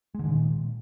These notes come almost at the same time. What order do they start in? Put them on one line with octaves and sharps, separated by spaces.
G#3 D3 D#3 A#2